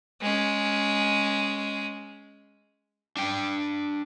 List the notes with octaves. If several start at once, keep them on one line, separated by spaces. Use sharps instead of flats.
G#3 C#4
D4 G5